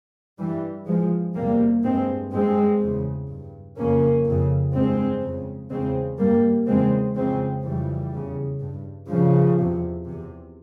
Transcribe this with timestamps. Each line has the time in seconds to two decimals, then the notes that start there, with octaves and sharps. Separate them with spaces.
0.38 G2 E3 G3
0.86 G2 F3 G#3
1.35 E2 C3 G3 A#3
1.84 G2 G#3 C4
2.32 G2 G#3 C4
2.80 E2 C#3
3.28 G2
3.77 F2 C#3 A#3 C#4
4.25 F2 C#3
4.73 G2 G#3 C4
5.22 F2 C#3
5.70 E2 C#3 G#3 C4
6.19 G2 G3 A#3
6.67 E2 C#3 G#3 C4
7.16 F2 C#3 G#3 C4
7.64 F2 C#3 E3 G3
8.12 E2 C#3
8.60 G2
9.09 G2 C#3 F3
9.58 E2 C3
10.05 E2 C3